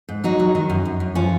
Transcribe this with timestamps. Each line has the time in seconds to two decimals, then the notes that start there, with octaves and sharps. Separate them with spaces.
0.09 G#2
0.24 F#3 D#4 F#4
0.39 F#3
0.55 D#3
0.70 F#2
0.85 F#2
1.00 F#2
1.15 F3 C#4 F4